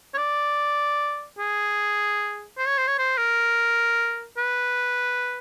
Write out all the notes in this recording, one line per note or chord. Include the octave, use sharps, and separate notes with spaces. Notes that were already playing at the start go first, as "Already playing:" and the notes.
C#5
D5
G#4
C5
C#5
C5
C#5
C5
A#4
B4